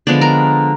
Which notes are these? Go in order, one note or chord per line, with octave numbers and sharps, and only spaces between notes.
D3 F3 G#3 B3 D5
A#4